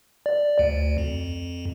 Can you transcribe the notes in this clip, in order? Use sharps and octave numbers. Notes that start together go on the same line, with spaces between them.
D5
D2
F2